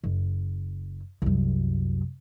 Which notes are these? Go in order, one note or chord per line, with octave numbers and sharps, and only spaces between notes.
F#1
C2 F#2